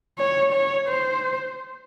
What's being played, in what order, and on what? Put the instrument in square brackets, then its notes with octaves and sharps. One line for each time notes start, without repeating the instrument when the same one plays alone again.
[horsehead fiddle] C#5
C#5
C5